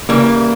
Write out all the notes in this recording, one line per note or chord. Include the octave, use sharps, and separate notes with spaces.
C#3 E3 G3 A#3